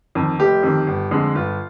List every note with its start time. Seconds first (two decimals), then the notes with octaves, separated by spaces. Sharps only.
0.15 F2 D#3
0.39 F1 G4
0.63 F2 D#3
0.87 G1
1.11 F2 D3 G#3
1.35 G1 F4